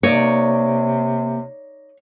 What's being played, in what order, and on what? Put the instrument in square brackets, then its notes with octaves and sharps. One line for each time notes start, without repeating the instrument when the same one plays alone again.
[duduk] C3 [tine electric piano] A#3 [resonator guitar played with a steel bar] D#4 D5 [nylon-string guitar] C#5